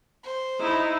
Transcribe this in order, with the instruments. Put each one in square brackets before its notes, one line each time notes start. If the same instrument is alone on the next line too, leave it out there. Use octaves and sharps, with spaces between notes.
[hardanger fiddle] C5
[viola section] D#4 E4